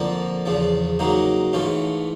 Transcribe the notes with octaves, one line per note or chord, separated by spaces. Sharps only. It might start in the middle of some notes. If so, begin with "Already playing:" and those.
Already playing: F2 D3 F3 A#3
E2 C#3 F3
C#3 F#3 A#3 D#4
G#2 E3 A3 C#4 F4